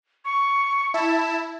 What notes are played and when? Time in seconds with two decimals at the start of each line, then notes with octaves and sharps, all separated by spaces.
0.25 C#6
0.94 E4 A5